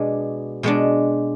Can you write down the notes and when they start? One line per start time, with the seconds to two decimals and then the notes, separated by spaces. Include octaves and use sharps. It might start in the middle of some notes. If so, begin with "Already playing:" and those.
Already playing: B2 G#3 B3 D4
0.63 B2 G#3 B3 D4